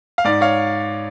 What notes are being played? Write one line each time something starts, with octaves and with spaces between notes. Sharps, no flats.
F5
G#2 D5
C#5 F5